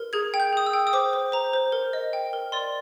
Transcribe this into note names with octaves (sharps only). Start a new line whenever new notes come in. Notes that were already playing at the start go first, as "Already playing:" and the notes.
Already playing: A#4
G#4 G#6
G5
G6
G#4 D#6
E6
G5
D#6
C5 D6
C5
C5 A#5
C5
A#4
D#5
G5
A#4
D5 C6